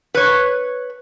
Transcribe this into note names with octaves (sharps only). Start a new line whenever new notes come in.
B4 C#5